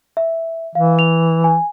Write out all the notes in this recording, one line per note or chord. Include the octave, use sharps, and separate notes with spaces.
E5
E3 F5
F7
G#5